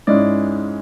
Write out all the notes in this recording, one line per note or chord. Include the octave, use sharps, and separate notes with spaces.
G#2 G#3 C#4 E4 D5